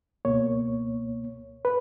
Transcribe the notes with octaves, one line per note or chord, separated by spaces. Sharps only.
C#2 B2 A#3 C#5
B4